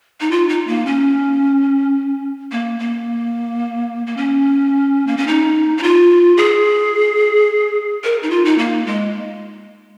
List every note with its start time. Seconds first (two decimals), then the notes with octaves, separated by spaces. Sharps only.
0.21 D#4
0.31 F4
0.49 D#4
0.67 A#3
0.86 C#4
2.52 A#3
2.79 A#3
4.07 A#3
4.17 C#4
5.07 A#3
5.17 C#4
5.27 D#4
5.78 D#4
5.83 F4
6.37 G#4
8.04 A#4
8.23 D#4
8.30 F4
8.45 D#4
8.58 A#3
8.86 G#3